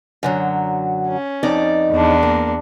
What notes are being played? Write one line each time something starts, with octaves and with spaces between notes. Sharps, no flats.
F#2 D3 F#3
C#4
F2 D#4 D5
E2 D4
A#3